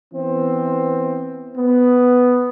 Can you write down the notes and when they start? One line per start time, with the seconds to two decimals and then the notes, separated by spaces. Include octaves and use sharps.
0.14 E3 B3 C4
1.56 B3